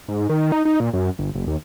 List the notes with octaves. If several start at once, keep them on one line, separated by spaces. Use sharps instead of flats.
G#2
D#3
D#4
D#4
A#2
F#2
G1
F#1
D#2